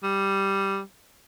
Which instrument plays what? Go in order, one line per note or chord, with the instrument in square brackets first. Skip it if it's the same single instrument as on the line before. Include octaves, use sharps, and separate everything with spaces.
[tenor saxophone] G3